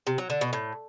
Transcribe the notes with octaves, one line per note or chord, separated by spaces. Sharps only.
C3
F#3
D3
B2
A2